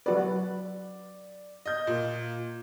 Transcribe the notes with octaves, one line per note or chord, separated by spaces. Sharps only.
F#3 F#4 B4 D5
D#5 G6
A#2